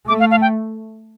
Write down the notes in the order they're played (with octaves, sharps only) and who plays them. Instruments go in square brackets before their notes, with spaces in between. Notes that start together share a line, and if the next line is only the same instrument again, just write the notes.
[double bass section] A3 [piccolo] D6
[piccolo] F5
F5
G5